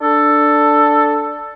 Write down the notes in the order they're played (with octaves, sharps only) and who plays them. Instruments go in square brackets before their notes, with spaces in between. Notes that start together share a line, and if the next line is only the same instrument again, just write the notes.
[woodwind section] D4 A4